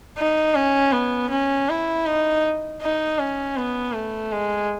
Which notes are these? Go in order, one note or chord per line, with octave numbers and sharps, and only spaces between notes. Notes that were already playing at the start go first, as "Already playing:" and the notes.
D#4
C#4
B3
C#4
E4
D#4
D#4
C#4
B3
A3
G#3